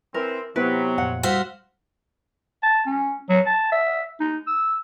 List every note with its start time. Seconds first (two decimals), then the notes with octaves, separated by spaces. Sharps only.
0.14 E3 C4 A#4
0.56 C3 F#3 B3 E4 B4
0.98 F2 A#2 F#5
1.23 G3 F#4 C5 F5 E6 B6
2.63 A5
2.86 C#4
3.29 F#3
3.46 A5
3.72 E5
4.20 D#4
4.47 E6